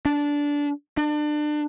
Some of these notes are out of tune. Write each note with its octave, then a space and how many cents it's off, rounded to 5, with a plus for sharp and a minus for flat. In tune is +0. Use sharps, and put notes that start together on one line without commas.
D4 -15
D4 +30